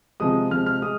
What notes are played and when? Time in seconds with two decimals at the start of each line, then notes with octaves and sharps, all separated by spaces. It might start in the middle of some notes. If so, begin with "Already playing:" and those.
0.20 C3 F3 G#3 D#6
0.51 C3 F3 G#3 F6
0.66 F6
0.82 G#3 D#6